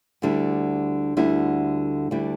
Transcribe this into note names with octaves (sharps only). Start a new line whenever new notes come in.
D2 D3 G3 E4
D2 D3 G3 E4
D2 D3 G3 E4